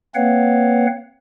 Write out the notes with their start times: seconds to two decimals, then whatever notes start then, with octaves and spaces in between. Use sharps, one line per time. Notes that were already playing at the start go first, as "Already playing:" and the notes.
0.15 A#3 C4 B4 C#5 F5 F#5